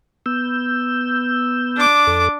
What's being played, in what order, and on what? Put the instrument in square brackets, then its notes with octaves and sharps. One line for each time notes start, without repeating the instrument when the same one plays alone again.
[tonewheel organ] B3 E6 G6
[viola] D4 D6
[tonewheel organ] F2 A4